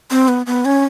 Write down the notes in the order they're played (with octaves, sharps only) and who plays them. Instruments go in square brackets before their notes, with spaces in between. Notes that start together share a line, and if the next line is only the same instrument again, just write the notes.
[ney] C4
B3
B3
C#4